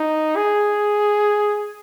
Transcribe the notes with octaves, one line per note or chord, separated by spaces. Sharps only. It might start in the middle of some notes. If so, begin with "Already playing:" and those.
Already playing: D#4
G#4